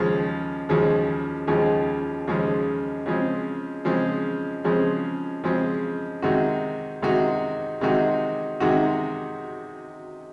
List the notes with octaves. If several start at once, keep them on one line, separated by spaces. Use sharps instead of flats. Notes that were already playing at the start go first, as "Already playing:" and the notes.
Already playing: D#2 C#3 F3 G#3
D#2 C#3 F3 G#3
D#2 C#3 F3 G#3
D#2 C#3 F3 G#3
C#3 F3 G#3 C4
C#3 F3 G#3 C4
C#3 F3 G#3 C4
C#3 F3 G#3 C4
C3 D#3 G#3 D#4 F#4
C3 D#3 G#3 D#4 F#4
C3 D#3 G#3 D#4 F#4
C3 D#3 G#3 D#4 F#4